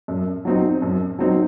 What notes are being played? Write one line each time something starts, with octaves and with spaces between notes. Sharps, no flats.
F#2
F#3 C4 D#4
F#2
F#3 C4 D#4